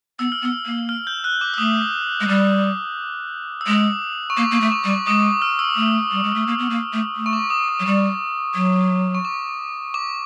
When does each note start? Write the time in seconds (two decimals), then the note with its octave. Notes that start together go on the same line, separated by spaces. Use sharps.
0.19 B3 E6
0.32 F6
0.42 B3
0.45 E6
0.66 A#3
0.89 F6
1.07 G6
1.24 F#6
1.41 D6
1.54 E6
1.58 A3 D#6
2.20 G#3
2.28 G3 D6
3.61 E6
3.67 G#3 D#6
4.30 C#6
4.37 A#3 D6
4.51 A#3 C#6
4.61 A3
4.72 D6
4.84 G3
4.90 D6
5.07 G#3 D#6
5.42 F6
5.59 E6
5.76 A3
6.12 G3
6.24 G#3
6.35 A3
6.47 A#3
6.59 B3
6.70 A#3
6.93 A3
7.16 A3
7.26 C#6
7.33 D6
7.50 D#6
7.68 D6
7.80 F#3
7.86 G3 C#6
8.55 F#3
9.15 C#6
9.25 D6
9.94 D6